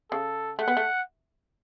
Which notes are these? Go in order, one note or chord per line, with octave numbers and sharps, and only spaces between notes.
C#3 A4
A3 F#5
B3
A3